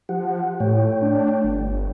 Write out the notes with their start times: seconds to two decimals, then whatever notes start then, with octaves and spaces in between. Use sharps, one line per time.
0.09 F3 G4 F#5
0.60 A2 A3 C#5 G5
1.02 D4
1.44 G1